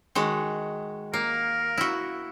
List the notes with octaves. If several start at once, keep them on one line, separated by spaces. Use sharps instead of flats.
D#3 G#3 F#4
A#3 A#4
E4 F#4